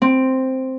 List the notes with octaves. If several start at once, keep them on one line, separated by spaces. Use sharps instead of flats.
C4